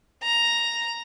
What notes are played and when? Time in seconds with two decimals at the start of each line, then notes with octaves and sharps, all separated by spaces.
0.23 A#5